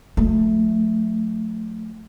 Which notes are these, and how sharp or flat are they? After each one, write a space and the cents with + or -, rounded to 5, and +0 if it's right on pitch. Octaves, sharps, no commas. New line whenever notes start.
F#3 -45 A3 +0